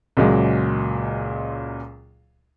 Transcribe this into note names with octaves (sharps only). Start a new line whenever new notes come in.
C#2 A#2 F#3 G#3